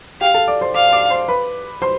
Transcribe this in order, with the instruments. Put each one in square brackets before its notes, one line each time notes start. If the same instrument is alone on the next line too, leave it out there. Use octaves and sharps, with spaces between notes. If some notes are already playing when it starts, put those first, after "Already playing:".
[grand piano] G4 G5 [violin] F5
[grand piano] A4 A5
D5 D6
C5 C6
[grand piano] D5 D6 [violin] F5
[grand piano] D5 D6
C5 C6
B4 B5
C5 C6